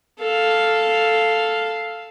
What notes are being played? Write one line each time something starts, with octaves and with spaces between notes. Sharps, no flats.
A4 F5